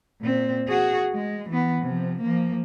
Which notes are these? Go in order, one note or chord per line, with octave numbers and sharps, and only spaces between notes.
A#2 C4
F#4 G#4
G#3
E3 B3
C3 F3
F3 A#3